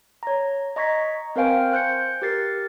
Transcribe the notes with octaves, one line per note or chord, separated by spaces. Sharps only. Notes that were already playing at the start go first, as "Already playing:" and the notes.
C#5 A#5
D#5 A#5 C#6 G#6 B6
C4 A#4 C5 F5 G5 G#5
C5 F#6 G6 C#7
G4 A#4 A6 C7